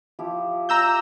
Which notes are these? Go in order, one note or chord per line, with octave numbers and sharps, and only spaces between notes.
F3 E4 G4
G4 D5 E5 A#5 E6 G6